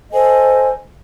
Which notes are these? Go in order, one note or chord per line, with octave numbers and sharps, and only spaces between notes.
A4 C5 D#5 G#5